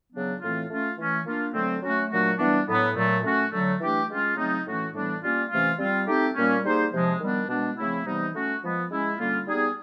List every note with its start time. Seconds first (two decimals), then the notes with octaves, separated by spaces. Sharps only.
0.12 C#3 F#3 B3 D4
0.41 A2 E3 A3 C4 F4
0.69 A3 C#4 F4
0.98 E3 A3 C#4
1.26 A#3 D4 F4
1.54 D3 F#3 A3 C4
1.83 F#3 A3 C#4 F#4
2.11 A#2 F#3 A3 D4 F#4
2.39 E3 G3 B3 D4
2.68 A2 F#3 B3
2.95 A#2 F#3 A3
3.24 A3 C#4 F#4
3.52 D3 F#3 A3
3.81 E3 A3 D4 G4
4.09 G#3 C#4 F4
4.37 C#3 F#3 A3 C4 D#4
4.66 A2 E3 A3 C#4 F#4
4.94 A2 E3 G3 B3 D4
5.22 G3 A#3 C#4 F4
5.51 C3 E3 A3 C#4 F4
5.79 G3 C4 F4
6.07 A3 C4 D#4 G4
6.36 A#2 G3 A#3 C#4
6.64 G3 A#3 D#4 G#4 C5
6.91 C3 F3 G#3
7.20 D#3 G3 B3 D4
7.48 B2 G#3 B3 D4
7.77 C#3 F3 A3 C4 E4
8.05 C3 E3 G3 B3 D#4
8.33 A3 C#4 F#4
8.62 F3 G#3 B3
8.90 G#3 C#4 E4
9.18 D3 G3 A#3 C#4 F4
9.46 G3 B3 D#4 G#4